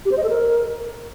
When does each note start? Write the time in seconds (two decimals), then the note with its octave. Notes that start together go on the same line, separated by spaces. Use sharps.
0.05 G4
0.11 C5
0.18 D#5
0.24 A4
0.30 A#4